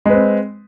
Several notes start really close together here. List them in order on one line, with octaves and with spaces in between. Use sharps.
G#3 B4 C4